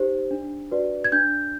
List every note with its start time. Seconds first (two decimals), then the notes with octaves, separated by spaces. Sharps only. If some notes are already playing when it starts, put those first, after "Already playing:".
Already playing: D#4 G4 C5
0.31 D4
0.71 F#4 B4 D5
1.04 G#6
1.12 D4 G6